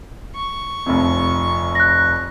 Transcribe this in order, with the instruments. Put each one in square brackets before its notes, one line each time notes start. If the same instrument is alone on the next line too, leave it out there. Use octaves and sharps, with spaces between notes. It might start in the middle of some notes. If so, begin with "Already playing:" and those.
[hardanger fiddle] C#6
[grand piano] F1 F2
[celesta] F#6 A#6